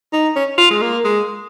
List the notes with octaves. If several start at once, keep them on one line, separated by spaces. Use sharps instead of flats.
D#4
C#4
F4
G#3
A#3
G#3